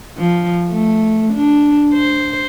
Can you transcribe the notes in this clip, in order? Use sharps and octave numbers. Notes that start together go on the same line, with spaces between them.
F3
A3
D4
C5